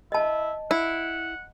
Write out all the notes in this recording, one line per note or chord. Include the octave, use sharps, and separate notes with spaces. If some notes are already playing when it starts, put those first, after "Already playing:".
E4 D#5 A5
E4 F#5